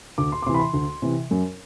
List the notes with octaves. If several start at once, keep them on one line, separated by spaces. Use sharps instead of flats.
D2 D6
C6
D6
C3 E3 C6
B5
C6
D2
C3 E3
F#2